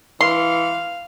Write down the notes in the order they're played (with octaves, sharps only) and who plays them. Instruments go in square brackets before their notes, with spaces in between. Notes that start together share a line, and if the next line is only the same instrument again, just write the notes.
[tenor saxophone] E3 [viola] F5 [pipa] C6